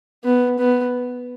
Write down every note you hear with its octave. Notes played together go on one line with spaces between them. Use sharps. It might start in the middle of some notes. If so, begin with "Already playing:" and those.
B3
B3